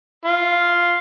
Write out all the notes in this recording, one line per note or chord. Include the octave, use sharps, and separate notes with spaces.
F4